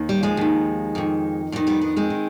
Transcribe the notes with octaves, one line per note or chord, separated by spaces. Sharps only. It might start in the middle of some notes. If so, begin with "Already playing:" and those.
Already playing: D#2 D#3
G3
F3 G#3
D#2 D#3
F2 D#3
F2 D#3 G3
G3 B3
B3 D4
G#3 C4
D#3